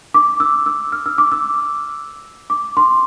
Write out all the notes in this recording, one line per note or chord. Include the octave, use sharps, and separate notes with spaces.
D6
E6
E6
F6
E6
D6
E6
D6
C6